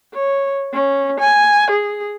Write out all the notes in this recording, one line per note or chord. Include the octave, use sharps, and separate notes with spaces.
C#5
C#4
G#5
G#4